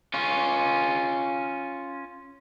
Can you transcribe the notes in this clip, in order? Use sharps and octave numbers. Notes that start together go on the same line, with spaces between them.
C#4 F4